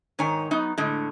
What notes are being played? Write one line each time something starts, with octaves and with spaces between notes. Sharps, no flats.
G#2 D#3 C#5 G#5
F#3 B3 D#4
A2 D3 G#3